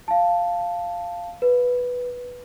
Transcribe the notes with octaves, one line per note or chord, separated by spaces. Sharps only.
F5 A5
B4